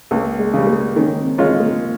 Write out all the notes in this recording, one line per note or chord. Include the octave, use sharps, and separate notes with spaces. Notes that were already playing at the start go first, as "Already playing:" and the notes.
C#2 A#3
G#3
C#3 G3
A#3
D#3 C#4
C4
G#3 C4 C#4 F4
A#3